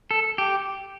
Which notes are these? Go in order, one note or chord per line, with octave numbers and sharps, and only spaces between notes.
A4
G4